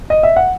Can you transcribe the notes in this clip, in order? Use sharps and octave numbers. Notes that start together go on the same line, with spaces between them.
D#5
E5
F#5